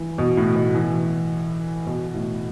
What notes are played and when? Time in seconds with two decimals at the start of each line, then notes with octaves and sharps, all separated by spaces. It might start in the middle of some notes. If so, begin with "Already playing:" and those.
Already playing: E3
0.18 B2
0.37 A2
0.56 B2
0.75 E3
1.87 B2
2.14 A2